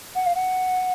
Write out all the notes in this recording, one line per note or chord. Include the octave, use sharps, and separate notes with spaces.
F#5
F5
F#5